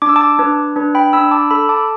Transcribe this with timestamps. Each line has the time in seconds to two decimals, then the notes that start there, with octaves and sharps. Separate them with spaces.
0.02 D4 D6
0.09 E6
0.16 A5 D6
0.39 D4 B4
0.76 D4 B4
0.95 G5 B5
1.13 D4 B5 E6
1.31 A5 D6
1.51 A4 B5 E6
1.69 A5 D6